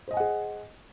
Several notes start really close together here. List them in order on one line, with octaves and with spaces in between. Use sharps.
C5 D#5 G#5 F#5 G#4